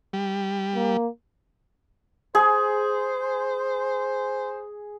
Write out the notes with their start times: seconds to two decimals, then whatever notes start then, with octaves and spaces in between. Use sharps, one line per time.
0.13 G3
0.75 A#3
2.35 G#4 C5